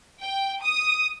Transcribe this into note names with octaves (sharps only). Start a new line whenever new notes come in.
G5
D#6